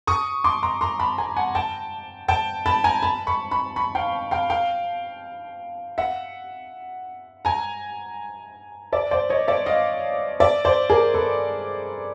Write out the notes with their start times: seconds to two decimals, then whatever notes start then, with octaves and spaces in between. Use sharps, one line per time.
0.07 C#6 D#6
0.44 C6 D6
0.63 A#5 C6
0.81 A#5 C6
0.99 A5 B5
1.18 G#5 A#5
1.36 F#5 G#5
1.55 G5 A5
2.28 G5 A5
2.66 A5 B5
2.84 G#5 A#5
3.02 A5 B5
3.27 B5 C#6
3.51 B5 C#6
3.76 B5 C#6
3.95 F5 G5
4.31 F5 G5
4.50 F5 G5
5.98 E5 F#5
7.45 G#5 A#5
8.93 D5 E5
9.11 C5 D5
9.30 C#5 D#5
9.48 D5 E5
9.66 D#5 F5
10.40 D5 E5
10.65 C5 D5
10.90 G#4 A#4
11.14 A4 B4